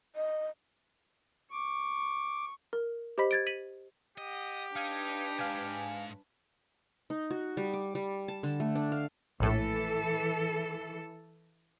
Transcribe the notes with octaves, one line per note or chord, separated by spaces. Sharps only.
D#5
C#6 D6
A#4
G4 C5 D#5 B5 B6
G#6 A6 D7
B6 D#7 F#7
G4 D#5 F#5
D4 D#4 B4 F5 G#6
C2 G#2 F5 G#5
D#4
F#4
G3
D6
G3
A5
D3
A3
D4
F5
A#1 A2 E3 A4